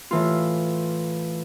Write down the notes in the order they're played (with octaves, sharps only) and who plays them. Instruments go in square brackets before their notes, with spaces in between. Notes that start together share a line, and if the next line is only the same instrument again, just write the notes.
[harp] A2 E3 F4